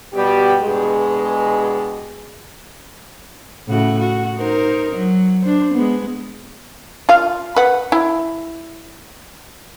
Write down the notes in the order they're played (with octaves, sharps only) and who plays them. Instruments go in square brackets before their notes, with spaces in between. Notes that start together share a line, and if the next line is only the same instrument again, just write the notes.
[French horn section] B2 G3 G4
G2 B2 G#3
[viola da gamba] A2 C#3 F#4
F#4
D#4 A#4 C5
F#3
D4 C5
G#3 B3
[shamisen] F4 F5
B4 F#5
E4